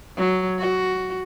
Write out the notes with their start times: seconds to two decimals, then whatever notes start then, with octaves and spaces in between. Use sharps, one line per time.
0.17 F#3
0.59 F#4